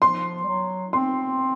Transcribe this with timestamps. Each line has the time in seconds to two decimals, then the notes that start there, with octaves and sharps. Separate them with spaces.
0.01 F3 C6
0.43 G3
0.48 F#3
0.93 C4 C6